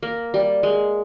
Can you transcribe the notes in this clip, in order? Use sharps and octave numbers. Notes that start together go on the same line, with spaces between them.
A#3
G3
G#3